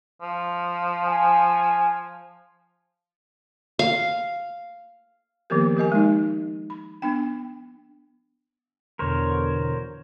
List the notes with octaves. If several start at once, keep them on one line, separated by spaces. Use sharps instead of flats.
F3
G#5
F5
D#3 F3 A#3 B3 G4 A#4
G4 A#4 D#5 G#5
G#3 D#4
B5
B3 D4 G5
E2 B2 D3 A#4 C5 C#5